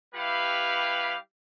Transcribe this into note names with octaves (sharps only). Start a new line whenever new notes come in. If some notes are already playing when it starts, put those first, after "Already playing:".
G3 E4 G4 B4 F5